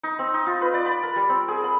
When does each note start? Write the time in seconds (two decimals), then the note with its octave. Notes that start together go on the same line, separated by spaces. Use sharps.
0.03 D#4
0.19 C4
0.34 D#4
0.47 F4
0.61 B4
0.74 D5
0.86 B5
1.03 A#4
1.16 G3
1.29 C4
1.48 G#4
1.64 B5